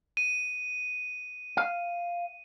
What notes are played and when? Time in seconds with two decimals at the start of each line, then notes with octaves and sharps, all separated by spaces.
0.17 D#7
1.57 F5